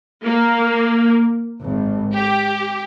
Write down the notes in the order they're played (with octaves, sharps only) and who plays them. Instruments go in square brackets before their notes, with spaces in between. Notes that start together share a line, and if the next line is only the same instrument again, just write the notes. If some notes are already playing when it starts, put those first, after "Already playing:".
[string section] A#3
G#1
G4